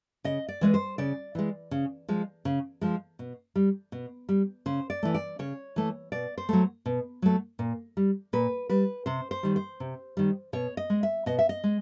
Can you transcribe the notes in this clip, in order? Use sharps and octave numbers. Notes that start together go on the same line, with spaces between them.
C#3 D#5
D5
E3 G#3 B4
C5
C#3 D5
E3 G#3
C#3
F3 G#3
C#3
F3 G#3
B2
G3
B2
G3
C#3 C5
D5
E3 A3
D5
C#3 C#5
E3 A3
B2 D5
C5
F#3 A3
B2
F#3 A3
A#2
G3
A#2 B4
G3 B4
C3 C5
C5
D#3 G3
C5
C3
D#3 G3
B2 C#5
D#5
G#3
E5
B2 D#5
E5
D#5
G#3